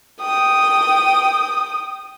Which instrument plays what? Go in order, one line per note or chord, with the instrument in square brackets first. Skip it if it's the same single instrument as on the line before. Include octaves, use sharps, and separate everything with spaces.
[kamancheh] G5 D#6